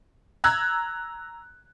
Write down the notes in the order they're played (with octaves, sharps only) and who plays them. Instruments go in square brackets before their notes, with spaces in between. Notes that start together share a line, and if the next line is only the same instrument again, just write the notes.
[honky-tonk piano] A#5 E6 F#6 G#6